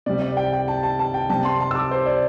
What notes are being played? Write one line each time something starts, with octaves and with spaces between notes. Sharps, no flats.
C3 G3 D5
D5
G5
G5
A5
A5
A5
G5
C3 G3 A5
C6
A5
E6
D6
C5
D5